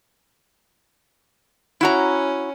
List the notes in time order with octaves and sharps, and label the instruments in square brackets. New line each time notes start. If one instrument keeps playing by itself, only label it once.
[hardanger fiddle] C#4 [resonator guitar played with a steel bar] E4 F#4 A#5